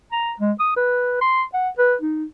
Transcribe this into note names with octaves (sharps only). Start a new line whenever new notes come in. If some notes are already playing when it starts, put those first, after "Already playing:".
A#5
G#3
D#6
B4
C6
F#5
B4
D#4